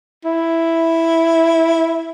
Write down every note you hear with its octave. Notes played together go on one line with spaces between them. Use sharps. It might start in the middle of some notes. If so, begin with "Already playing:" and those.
E4